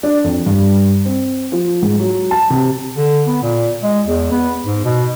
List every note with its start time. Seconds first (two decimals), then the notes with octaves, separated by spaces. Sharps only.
0.03 D4
0.24 F2
0.46 G2
1.05 C4
1.52 F3
1.83 G#2
1.99 F#3
2.31 A5
2.50 C3
2.97 D3
3.27 B3
3.42 A#2
3.83 G#3
4.07 E2
4.31 B3
4.64 G#2
4.84 B2